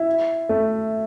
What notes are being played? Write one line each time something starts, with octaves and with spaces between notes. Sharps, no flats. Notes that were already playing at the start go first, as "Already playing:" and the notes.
Already playing: E4
A3